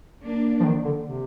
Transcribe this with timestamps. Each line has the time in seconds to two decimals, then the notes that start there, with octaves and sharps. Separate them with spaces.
0.23 A#3 D4
0.61 F3
0.65 D#3
0.85 D3
1.06 C3